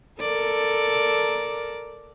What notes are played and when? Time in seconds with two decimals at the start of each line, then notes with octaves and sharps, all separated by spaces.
0.20 A4 A#4 D5